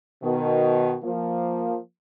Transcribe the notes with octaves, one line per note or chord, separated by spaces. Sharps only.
B2 D#3
F3 A#3